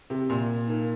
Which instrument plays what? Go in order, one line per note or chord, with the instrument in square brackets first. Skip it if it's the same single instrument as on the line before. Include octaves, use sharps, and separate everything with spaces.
[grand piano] C3
A#2
[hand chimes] D#4 A#4 F5